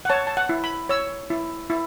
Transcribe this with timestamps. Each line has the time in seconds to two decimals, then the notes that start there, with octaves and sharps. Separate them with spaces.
0.05 F#5
0.09 C#5 A5
0.27 A5
0.37 F#5
0.49 E4
0.64 B5
0.89 C#5 E6
1.30 E4
1.70 E4